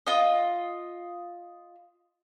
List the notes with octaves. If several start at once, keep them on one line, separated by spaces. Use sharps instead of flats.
F4 D#5